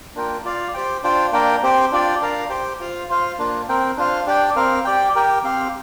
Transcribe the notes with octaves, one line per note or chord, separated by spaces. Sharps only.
A#3 D4 F4 A#4 G5
F4 D5 F5
G4 C5 G5
D4 F4 C5 G5
A#3 D4 A#4 G5
C4 G4 C5 G5
D4 F4 D5 G5
D4 A#4 F5
G4 C5 G5
F4 C5 F5
F4 C5 F5
A#3 D4 F4
C4 A#4 G5
D4 F4 C5 F5
D4 G4 D5 G5
C4 A#4 F5
G4 D5 G5
G4 A#4 G5
C4 G4 C5 F5